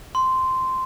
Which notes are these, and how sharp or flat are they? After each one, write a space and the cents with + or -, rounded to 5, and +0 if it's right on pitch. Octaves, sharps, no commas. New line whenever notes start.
C6 -10